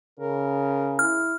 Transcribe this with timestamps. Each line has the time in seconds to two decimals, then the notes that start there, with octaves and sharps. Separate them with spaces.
0.19 C#3 A#4
0.99 E4 F6